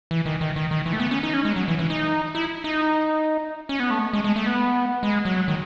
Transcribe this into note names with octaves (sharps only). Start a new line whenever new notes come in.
E3
D#3
D#3
D#3
D#3
E3
A3
B3
C#4
D#4
C#4
G#3
F#3
E3
E3
D#4
E4
D#4
C#4
B3
A3
G#3
G#3
A3
B3
G#3
F#3
D#3